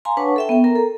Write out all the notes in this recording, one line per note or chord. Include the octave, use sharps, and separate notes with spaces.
F5 G#5 A#5 C6
D4 B4 C#5 F#5 A5 C#6
A4 E5 G5
B3 G5
A#4 A#5
A4